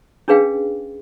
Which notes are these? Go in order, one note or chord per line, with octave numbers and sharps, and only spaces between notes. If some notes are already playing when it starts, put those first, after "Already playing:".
C#4 D4 G#4 B4 F5 G5